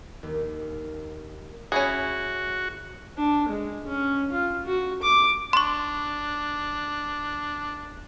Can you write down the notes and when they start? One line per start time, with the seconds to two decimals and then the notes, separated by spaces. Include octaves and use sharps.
0.23 D#2
1.72 C#4 E4 F#4 G#4
3.18 D4
3.49 G#3
3.87 C#4
4.32 F4
4.66 F#4
5.03 D6
5.53 D4 C6 C#6